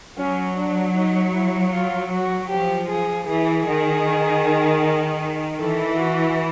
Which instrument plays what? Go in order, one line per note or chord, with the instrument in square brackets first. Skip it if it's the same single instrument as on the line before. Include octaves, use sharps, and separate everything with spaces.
[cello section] F#3 [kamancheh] C#4
[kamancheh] D4
D#4
E4
F4
F#4
[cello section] F3 [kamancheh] G4
[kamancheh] G#4
[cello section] E3 [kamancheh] G#4
[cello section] D#3
[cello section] E3 [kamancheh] A4
[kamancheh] F#4